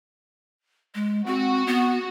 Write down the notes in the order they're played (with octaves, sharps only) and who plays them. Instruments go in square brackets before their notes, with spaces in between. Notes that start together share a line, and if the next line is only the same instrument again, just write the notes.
[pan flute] G#3
[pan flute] C4 [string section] F#4
[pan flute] B3